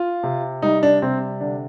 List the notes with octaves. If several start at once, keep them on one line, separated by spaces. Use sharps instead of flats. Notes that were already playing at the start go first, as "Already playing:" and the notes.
Already playing: F4
C3
G3 D#4
D4
C3 C4
D3 D4